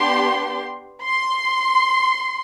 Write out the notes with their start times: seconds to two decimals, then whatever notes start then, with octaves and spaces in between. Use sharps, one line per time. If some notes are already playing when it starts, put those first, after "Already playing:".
Already playing: B3 D4 G4 C6
1.05 C6